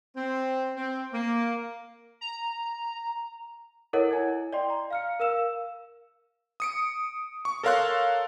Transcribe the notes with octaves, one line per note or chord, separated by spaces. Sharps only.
C4
C4
A#3
A#5
E4 A4 A#4 C#5 D#5 F#5
E4 G#5 G#6
D5 D#5 G5 C6
A#5
F5 F6 C#7
A#4 F5 E6 E7
D#6 C#7 D7
C#6
A4 A#4 C#5 F5 C6 F#6